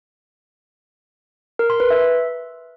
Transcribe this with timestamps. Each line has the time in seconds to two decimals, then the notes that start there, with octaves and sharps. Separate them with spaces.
1.59 A#4
1.70 C6
1.80 B4
1.90 E5